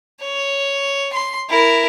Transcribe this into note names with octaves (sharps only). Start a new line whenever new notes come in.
C#5
C6
E4 A#4